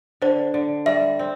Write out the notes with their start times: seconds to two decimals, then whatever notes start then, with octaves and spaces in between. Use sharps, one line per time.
0.22 D3 C5
0.54 D3
0.86 G3 E5
1.19 C4